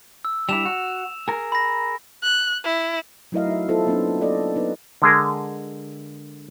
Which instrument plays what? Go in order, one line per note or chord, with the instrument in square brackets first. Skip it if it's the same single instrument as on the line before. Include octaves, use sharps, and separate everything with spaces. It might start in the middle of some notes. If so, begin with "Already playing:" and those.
[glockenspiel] E6
[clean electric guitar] G3 D4 E4 [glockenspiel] E7 F7
[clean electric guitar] F#4
G#4 A#4
[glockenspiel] B5 A#6
[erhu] F#6
E4
[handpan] F#3 A3 E4 A#4 D#5 F5
D#4 F#4 E5
B3 E4 F4 A4 C5
F#3 A#3 B3 C#4 D4
A#3 A4 D5 D#5
F#3 B3 D#4 B4
[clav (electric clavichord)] D3 G#3 G#4 A#4